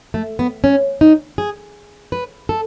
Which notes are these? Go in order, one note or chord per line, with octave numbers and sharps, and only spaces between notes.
A3
B3
C#4
D#4
G#4
B4
A4